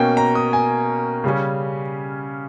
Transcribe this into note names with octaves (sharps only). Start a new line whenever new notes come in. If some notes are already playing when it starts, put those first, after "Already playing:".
Already playing: B2 A#3 C#4 G5
A#5
D#6
G#5
C#3 G3 C#4